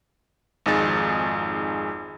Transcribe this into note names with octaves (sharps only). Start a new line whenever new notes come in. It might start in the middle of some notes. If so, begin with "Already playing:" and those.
G#1 F2 D#4 G#4 A6